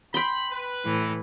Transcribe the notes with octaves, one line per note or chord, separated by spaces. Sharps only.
G5 B5 C6
B4
A2 E3